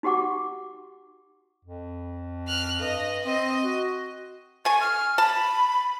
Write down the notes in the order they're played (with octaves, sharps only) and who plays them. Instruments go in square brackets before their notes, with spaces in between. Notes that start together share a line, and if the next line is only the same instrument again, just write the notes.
[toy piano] D#4 F#4 G4 F#5 D6
[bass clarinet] F2
[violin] F6 F#6
[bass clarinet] G2 [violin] D#5
[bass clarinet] C4 [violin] D#5
[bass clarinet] F#4
[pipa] D3 G#5 [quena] C#6
[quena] F6
[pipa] A5 [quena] B5